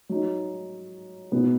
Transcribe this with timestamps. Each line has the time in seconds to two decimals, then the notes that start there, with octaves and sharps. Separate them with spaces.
0.09 F#3 D#4
1.32 B2 B3 D#4